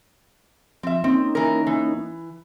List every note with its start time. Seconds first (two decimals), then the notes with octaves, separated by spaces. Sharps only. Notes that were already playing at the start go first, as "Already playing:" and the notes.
0.83 F3 C4 E5
1.04 A#3 C4 C#4 D#4
1.35 E3 A#4
1.67 E3